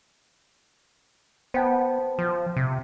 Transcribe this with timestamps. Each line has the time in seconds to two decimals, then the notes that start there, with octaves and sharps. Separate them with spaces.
1.54 B3 C5 G5 A5
2.19 F3
2.57 C3